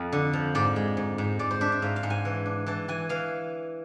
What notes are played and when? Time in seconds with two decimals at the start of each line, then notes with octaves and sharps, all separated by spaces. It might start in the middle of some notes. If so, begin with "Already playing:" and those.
Already playing: F2
0.13 D3
0.33 F3
0.55 G#2 D5
0.76 G#3
0.97 G#2
1.18 G#2
1.39 G#2 D5
1.51 C5
1.61 D4 E5
1.72 E5
1.82 G#2 F5
1.96 F5
2.03 G#2
2.10 G#5
2.25 E3
2.46 D4
2.66 E3 A5
2.88 E3 G#5
3.09 E3 F5